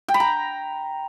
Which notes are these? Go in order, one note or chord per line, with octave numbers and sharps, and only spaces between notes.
G5
B5
A#5